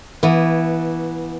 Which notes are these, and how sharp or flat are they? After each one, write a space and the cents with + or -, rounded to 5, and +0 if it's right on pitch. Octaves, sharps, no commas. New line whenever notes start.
E3 +0 B3 -20